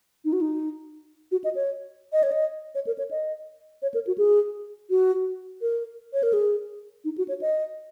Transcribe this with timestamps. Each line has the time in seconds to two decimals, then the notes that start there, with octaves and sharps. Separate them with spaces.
0.25 D#4
0.33 F#4
0.41 D#4
1.32 F#4
1.44 D#5
1.55 C#5
2.13 D#5
2.23 C#5
2.32 D#5
2.75 C#5
2.87 A#4
2.98 C#5
3.11 D#5
3.82 C#5
3.94 A#4
4.07 F#4
4.18 G#4
4.90 F#4
5.62 A#4
6.13 C#5
6.23 A#4
6.33 G#4
7.05 D#4
7.18 F#4
7.28 C#5
7.41 D#5